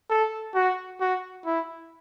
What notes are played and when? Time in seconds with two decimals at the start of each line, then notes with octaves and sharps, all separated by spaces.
0.10 A4
0.55 F#4
1.00 F#4
1.46 E4